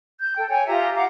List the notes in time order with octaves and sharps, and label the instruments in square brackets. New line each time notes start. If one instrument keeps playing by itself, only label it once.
[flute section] G6
A4 G5
C#5 G5 G#5
F4 G4 E5 A#5
F5 F#5 A#5 D6